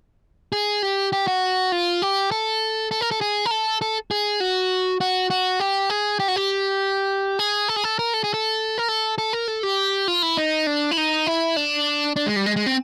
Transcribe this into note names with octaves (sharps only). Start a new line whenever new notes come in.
G#4
G4
G4
F#4
F4
G4
A4
A4
A#4
A4
G#4
A#4
A4
A4
G#4
F#4
F#4
F#4
G4
G#4
G4
F#4
G4
G#4
A4
G#4
A4
A#4
A4
G#4
A4
A#4
A4
A4
A#4
A4
G4
F4
E4
D#4
D4
E4
D#4
E4
D4
D4
G#3
G3
G#3
G#3
C4